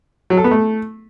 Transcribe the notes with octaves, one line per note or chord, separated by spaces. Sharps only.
F#3
A4
B3
A3